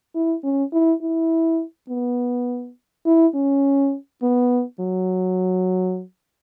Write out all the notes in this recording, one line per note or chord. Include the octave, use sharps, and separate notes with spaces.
E4
C#4
E4
E4
B3
E4
C#4
B3
F#3